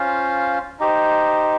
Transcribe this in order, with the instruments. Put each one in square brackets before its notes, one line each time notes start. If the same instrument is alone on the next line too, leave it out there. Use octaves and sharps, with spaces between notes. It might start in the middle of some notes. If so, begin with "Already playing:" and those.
Already playing: [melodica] C#4 F4 C5 F5
D#4 G4 C5